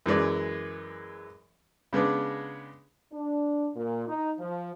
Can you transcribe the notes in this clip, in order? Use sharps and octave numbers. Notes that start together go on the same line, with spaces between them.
F#2 E3 G#3 D5
C#3 G#3 B3 D4
D4
A#2
D#4
F3